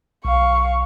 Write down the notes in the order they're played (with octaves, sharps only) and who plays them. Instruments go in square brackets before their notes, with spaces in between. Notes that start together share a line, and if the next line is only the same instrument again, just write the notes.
[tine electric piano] B1 [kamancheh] F5 C#6